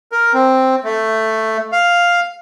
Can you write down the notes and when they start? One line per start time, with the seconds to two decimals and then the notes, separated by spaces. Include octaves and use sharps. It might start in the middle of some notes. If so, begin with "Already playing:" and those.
0.12 A#4
0.34 C4
0.84 A3
1.72 F5